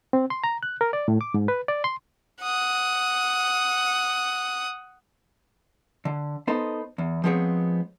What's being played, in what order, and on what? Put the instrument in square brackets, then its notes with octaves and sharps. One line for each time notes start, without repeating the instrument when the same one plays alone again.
[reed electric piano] C4
C6
A#5
F#6
A#4
D5
A2
D6
G#2
B4
D5
C6
[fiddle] F#5 D#6
[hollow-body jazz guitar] D3
B3 D#4 A4 C5
E2
F3 G#3 B3 C4 G#4 C#5